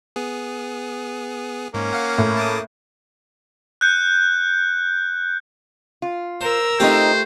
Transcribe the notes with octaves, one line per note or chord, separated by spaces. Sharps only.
B3 G#4
G#2 A#3 C#4
F5 F#5
A2
A5 D6 D#6
F#6 G6 C#7
F4
A#4 C5 E6
A3 C4 D#4 F4 G4 C5